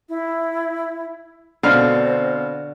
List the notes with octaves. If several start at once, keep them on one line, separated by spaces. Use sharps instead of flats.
E4
B2 D3 C4 F5 F6